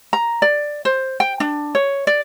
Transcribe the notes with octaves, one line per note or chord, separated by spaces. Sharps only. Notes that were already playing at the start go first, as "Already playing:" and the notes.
A#5
D5
C5
G5
D4
C#5
D5